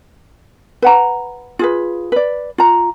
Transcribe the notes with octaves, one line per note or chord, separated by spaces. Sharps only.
B4 F#5 A#5
F4 G#4 B4
B4 D5
F4 A#5